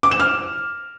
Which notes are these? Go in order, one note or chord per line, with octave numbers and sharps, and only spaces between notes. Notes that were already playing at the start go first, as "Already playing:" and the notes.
D6
E7
F6